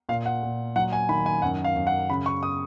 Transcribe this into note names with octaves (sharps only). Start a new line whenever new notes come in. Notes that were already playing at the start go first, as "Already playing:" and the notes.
A#2 F5
F#5
A#2
F#3 F#5
G#5
D#3 B5
G#5
F#2 F#5
F5
F#2
F#5
C#3 B5
C#6
D#6